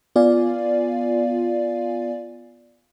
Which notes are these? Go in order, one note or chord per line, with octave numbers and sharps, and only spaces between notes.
B3 F4 D5 F5 G#5